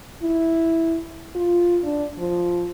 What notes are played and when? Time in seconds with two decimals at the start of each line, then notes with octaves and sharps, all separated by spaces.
0.23 E4
1.35 F4
1.83 D4
2.18 F3